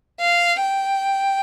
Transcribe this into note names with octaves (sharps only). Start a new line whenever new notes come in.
F5
G5